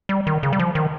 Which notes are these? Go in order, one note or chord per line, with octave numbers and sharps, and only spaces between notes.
G3
D#3
C#3
G3
F3
D#3